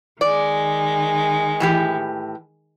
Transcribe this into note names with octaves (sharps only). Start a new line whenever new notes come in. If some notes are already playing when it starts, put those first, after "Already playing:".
D#3 G#3 D5
A2 E3 G4